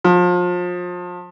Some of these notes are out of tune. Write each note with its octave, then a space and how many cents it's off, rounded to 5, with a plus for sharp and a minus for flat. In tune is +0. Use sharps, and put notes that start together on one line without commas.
F3 +30